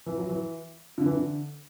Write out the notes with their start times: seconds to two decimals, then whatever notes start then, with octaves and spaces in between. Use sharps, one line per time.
0.06 E3
0.18 F#3
0.29 E3
0.98 D3
1.06 E3
1.13 D3